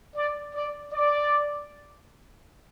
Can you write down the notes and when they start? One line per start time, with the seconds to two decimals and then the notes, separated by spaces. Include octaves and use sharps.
0.16 D5
0.54 D5
0.93 D5